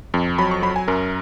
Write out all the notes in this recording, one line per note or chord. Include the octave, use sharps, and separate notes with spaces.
F2
F#3 B5
C#6
F#3 B5
G#5
F#2 A#4